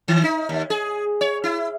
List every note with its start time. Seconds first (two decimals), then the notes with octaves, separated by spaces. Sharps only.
0.08 D#3
0.24 D#4
0.49 D#2
0.70 G#4
1.21 C#5
1.44 E4